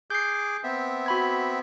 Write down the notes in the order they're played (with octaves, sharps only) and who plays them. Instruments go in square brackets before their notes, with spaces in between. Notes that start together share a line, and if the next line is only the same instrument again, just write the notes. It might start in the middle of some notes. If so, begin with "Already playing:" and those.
[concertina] G#4 D6 [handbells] G6 C7
[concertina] B3 C4 E5
[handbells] F#4 B5 G#6